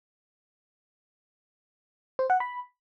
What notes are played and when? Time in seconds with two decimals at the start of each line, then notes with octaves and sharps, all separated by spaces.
2.19 C5
2.30 F#5
2.40 B5